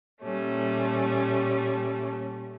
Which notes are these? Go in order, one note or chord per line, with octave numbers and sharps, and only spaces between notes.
A#2 G3 A3 C#4